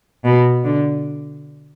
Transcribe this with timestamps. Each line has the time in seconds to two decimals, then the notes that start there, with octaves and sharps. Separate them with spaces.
0.25 B2
0.64 D3